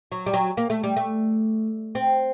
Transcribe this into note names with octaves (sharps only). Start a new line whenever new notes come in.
F#3
G3
F#3
A#3
A3
G3
A3
C4